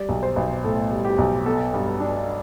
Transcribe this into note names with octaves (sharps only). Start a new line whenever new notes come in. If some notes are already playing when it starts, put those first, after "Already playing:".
Already playing: G3 D5
B1
C5
B1
A2 A4
G3
G4
B1
B3 A4
G2
D4